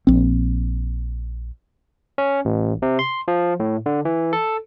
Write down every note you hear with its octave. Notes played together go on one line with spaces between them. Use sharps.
A#1 C4
C#4
A1
C3
C6
F3
A2
D3
E3
A4